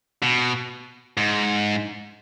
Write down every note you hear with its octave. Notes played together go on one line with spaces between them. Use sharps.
B2
G#2